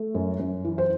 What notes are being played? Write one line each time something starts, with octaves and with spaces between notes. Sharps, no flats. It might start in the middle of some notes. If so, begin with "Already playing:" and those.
Already playing: A3
F#2
F#2
E3
C5